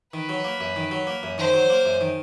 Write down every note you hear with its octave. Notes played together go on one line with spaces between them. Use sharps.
D#3 B4
F#3
A#3
F#2
D#3
F#3
A#3
F#2
D#3 C5
F#3
A#3
F#2
D#3